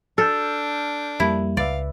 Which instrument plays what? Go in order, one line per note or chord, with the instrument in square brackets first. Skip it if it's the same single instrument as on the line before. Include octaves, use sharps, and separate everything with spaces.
[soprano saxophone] D4 [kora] A4 [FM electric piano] F6 G6
[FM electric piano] F2 G3 A#3 [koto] E4
[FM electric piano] C#2 B4 E5 [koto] D5 [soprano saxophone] F5